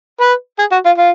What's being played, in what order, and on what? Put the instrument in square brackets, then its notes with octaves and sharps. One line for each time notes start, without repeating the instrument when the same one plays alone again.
[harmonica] B4
G#4
F#4
F4
F4